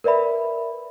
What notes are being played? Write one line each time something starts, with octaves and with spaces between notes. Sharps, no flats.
A#4 B4 D5 E5 B5